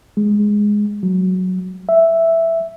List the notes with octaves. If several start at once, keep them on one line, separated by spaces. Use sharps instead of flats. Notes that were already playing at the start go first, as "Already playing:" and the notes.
G#3
F#3
E5